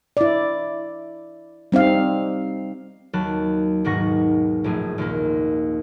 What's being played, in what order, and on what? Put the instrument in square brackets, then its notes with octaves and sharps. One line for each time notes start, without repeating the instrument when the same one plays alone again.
[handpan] E4 D5
G3 C4 D#4 F5
[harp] D#2 F#3 A5 F#6
B1 G#2 D#3 F#5 C#6 A#6
A#1 A2 A3 G#4
D#2 A#2 A#3